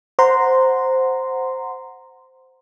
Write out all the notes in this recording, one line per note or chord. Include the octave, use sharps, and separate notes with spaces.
C5 F#5 A#5 C6